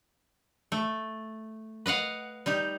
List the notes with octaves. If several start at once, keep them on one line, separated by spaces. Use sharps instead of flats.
A3
B4 D#5 F5 F#5
G3 D#4 G4